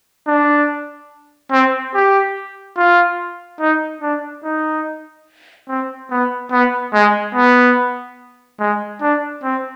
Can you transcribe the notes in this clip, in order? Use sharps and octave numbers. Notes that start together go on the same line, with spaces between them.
D4
C4
G4
F4
D#4
D4
D#4
C4
B3
B3
G#3
B3
G#3
D4
C4